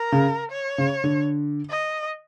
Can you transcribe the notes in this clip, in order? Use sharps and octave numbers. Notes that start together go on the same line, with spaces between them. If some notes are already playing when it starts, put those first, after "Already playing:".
Already playing: A#4
C#3
C#5
C#3
D3
D#5